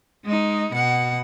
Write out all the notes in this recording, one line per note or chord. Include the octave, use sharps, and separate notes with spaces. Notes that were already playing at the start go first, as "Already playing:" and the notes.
G#3 D#4
B2 F#5